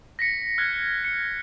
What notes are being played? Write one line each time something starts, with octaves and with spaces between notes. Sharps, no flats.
A#6 B6 C#7
F6 F#6 G#6
C#7